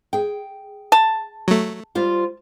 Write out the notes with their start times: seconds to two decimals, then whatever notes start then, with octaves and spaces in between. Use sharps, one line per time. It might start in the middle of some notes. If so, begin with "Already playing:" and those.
0.13 G#4 G5
0.92 A5
1.48 F#3 A3
1.95 G3 F4 C5